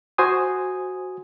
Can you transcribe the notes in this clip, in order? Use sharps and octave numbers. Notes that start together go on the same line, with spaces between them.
F#4 C5 G#5 D#6